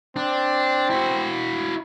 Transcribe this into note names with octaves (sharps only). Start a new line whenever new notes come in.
C4 D4
E4 F#4